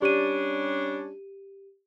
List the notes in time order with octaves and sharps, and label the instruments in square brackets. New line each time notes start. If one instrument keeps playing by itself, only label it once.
[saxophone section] G3 C#4 D4 [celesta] G4 D#7